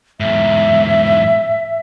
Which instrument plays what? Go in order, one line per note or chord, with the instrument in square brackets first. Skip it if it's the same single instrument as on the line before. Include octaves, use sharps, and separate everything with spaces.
[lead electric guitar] E2 G#2 [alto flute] E5